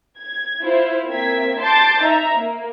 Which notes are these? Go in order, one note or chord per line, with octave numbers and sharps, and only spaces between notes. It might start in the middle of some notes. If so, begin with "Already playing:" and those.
G#6
E4 F4 C5
A#3 C4 E5 G#6 B6
A5 C6 D6 G6 A6
D#4 E5 A#5
A#3